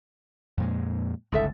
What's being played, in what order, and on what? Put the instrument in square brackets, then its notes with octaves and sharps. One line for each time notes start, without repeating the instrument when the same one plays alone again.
[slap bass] F2 A#2 G#3
[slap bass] G1 C#2 [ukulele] D#4 A4 E5